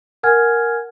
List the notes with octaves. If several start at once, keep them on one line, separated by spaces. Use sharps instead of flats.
A#4 F#5 G#5 F6 G#6